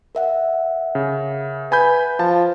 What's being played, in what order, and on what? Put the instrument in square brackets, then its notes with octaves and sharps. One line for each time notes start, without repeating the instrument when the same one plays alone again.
[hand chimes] A#4 E5 F#5
[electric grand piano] C#3
[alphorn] B4 [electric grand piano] G#5 B5 G6
[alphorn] F3 [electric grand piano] A5